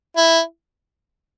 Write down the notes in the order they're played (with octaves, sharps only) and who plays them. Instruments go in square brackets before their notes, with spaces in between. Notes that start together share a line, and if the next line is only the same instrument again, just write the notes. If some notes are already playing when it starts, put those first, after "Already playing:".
[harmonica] E4